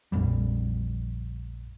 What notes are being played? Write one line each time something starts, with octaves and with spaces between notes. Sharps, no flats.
A#1 F2 G3